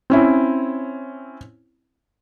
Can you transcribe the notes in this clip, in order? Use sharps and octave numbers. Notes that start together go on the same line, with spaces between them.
C4 C#4 E4